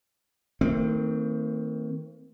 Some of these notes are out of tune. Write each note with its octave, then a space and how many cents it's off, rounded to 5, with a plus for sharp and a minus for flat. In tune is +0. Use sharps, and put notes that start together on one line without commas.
D#3 +25 A3 +45 C4 +0